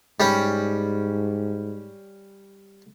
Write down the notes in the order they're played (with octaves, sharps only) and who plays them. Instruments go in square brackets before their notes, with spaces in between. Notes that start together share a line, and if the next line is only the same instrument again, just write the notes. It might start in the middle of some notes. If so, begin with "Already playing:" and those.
[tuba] G#2 [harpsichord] G3 C#4